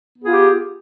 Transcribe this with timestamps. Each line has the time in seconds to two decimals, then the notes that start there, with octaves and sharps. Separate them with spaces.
0.17 B3
0.22 G#4
0.26 F4
0.30 G4